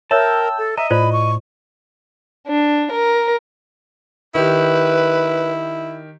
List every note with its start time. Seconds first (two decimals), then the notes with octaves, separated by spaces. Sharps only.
0.11 A#4 C#5 E5 G5 A5 E6
0.58 A4
0.77 D#5 E5 A#5
0.90 A2 F4 C5 D5 B5
1.12 C#6
2.47 D4
2.92 A#4
4.35 D#3 E4 G4 B4